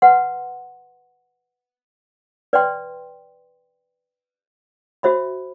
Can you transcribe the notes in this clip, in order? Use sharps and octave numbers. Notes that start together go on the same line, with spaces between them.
B4 F#5 C6
B4 D5 G5 C6
F#4 C5 E5 B5